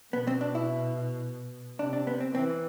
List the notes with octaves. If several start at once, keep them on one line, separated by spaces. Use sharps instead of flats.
B2 B3
C4
D4
E4
C3 D4
D4
B3
C4
E3 C4